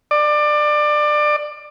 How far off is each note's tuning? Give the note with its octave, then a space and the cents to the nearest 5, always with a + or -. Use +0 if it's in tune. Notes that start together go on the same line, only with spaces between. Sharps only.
D5 +25